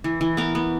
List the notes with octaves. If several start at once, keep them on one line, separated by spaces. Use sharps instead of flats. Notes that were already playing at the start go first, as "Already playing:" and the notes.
E3
E3
B3 A#4
B3